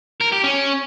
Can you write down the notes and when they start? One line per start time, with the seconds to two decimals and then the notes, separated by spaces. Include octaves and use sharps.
0.21 A#4
0.32 G4
0.44 C#4